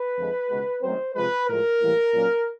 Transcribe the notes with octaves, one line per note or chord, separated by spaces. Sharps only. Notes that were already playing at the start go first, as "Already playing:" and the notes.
Already playing: B4
F2 D3 F3 G#3
C#2 B2 G#3
F#2 D#3 F#3 A3 C4 C5
C3 F3 G#3 B4
A2 F3 G#3 A#4
A2 E3 G3 A#3
A#2 F#3 A#3 C#4